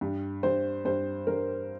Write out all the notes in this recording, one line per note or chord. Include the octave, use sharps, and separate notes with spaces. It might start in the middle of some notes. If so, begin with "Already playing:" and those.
G2
G2 C5
G2 C5
G2 A#4